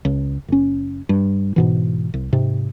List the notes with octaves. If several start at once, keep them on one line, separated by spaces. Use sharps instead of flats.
C#2
F#1 C#4
G2
G#2 B2 E3
C2
G#2 C3